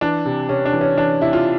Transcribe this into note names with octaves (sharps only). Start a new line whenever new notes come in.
E3 D4
C3
C3 C#4
D4
E3
C#4
E3 D4
C3 E4
F4